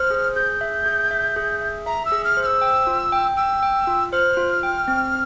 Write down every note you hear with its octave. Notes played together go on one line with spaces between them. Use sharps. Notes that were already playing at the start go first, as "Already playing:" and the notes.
Already playing: C5 F6
G#4
G#4 G6
E5
G#4
E5
G#4
E5
E5 A#5
E6
G#4
F6
C5
F6
E6
G5
F4
G5
G5 E6
G5
F4
C5 F6
F4
G5
C4